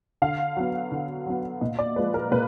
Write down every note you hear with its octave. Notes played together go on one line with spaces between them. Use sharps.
D3 F5
F#3 B3
D3
F#3 B3
A#2 D#5
D5
F3 G#3 B4
A#4
A#2 B4